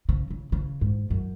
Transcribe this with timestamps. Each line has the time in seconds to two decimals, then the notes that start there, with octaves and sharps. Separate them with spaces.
0.09 C#3
0.30 C#3
0.52 C#3
0.81 G#2
1.10 F#2